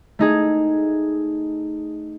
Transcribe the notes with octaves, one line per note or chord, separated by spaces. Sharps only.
A3 D#4 G#4